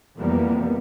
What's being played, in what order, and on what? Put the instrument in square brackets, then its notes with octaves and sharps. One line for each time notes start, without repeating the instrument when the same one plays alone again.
[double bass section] F2 C3 E3 G3 A#3 B3